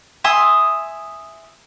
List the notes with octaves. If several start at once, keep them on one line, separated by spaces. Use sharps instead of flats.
E5 G#5 C6 D#6